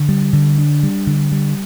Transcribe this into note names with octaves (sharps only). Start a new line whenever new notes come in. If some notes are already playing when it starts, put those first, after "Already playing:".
Already playing: D3
G3
D3
D4
G3
D3
G3